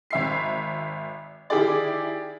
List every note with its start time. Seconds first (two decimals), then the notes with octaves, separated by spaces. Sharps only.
0.10 G#1 E5 C7
1.50 D#3 E4 G4 G#4 D5